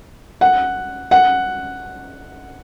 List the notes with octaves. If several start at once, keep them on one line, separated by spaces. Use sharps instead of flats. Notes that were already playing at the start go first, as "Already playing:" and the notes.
F#5
F#5